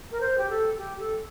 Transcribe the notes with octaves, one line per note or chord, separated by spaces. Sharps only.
A#4
C5
G4
A4
G4
A4